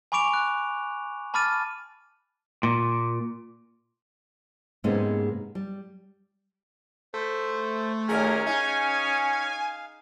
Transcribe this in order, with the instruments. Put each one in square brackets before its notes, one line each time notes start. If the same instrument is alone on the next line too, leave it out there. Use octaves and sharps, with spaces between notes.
[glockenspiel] G#5 B5 C#6 D6 D7 F7
F#6
A5 B5 D6 F6 A6 D#7
[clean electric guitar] A#2
[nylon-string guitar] G#2 C3 G#3 A#3 B3 C#4
G3
[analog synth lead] A3 [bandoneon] C5
[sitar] D#2 A#2 G#4 [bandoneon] F#3 A#4 F6 [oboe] C#4
[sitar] D#4 [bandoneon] F5 [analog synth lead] G#5